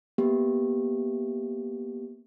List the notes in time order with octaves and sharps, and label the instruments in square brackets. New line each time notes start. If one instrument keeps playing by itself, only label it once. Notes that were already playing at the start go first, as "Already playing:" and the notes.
[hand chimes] A#3 B3 G4